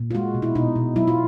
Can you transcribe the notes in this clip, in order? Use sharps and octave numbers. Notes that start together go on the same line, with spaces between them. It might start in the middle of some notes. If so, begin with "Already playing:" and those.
Already playing: A#2
F4
G#3 F#4
B2
E4
B2 D#4
B2
F#3 E4
F4